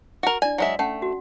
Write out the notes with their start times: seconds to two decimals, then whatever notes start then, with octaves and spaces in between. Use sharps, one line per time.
0.23 F#4 A#4
0.42 D4 E4 D5 G#5
0.58 F#3 G#3 E5
0.79 A3 C#4 F#5
1.02 F#4